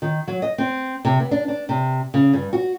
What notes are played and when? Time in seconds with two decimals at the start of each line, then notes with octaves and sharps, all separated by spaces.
0.02 D#3
0.28 F#3
0.42 D#5
0.58 C4
1.05 C3
1.20 B3
1.31 D4
1.48 D4
1.69 C3
2.14 C#3
2.33 G2
2.53 F#4